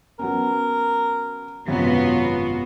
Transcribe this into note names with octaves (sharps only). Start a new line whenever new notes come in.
F#3 B3 C#4 A#4
G#1 F#2 C3 F#3 B3 F4 F#4